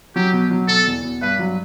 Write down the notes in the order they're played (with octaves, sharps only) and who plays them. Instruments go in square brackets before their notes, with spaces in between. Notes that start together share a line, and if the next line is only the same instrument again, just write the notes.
[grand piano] F#3 [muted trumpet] G4
[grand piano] B2
F#3
[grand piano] B2 [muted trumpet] A4
[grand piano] E2
B2
[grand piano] G2 [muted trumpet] B4
[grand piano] F#3